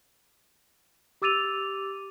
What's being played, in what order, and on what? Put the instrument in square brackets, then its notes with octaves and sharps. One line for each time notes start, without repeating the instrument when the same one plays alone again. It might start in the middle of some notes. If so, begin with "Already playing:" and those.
[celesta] G4 D6 E6 A6 D#7 F7